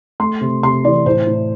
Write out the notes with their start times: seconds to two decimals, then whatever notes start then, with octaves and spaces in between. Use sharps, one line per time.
0.20 A3 C6
0.41 C3
0.63 C3 C6
0.84 E3 D5
1.06 A2 C5
1.27 A2